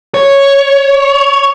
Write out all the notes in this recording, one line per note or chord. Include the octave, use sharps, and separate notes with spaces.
C#5